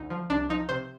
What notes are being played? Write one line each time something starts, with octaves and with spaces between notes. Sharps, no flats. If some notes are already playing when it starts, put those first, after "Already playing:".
Already playing: D2 D#4
F3
C2 D4
F3 D#4
C3 C5